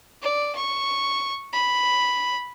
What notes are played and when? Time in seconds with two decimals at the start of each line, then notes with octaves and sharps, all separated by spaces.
0.22 D5
0.55 C#6
1.53 B5